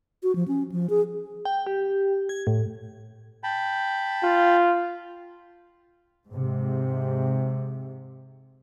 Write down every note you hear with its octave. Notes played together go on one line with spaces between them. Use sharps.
F#4
F3
C#4
F3
G#4
G5
G4
G#6
A2
G5 A5 B5
F4
G#2 C3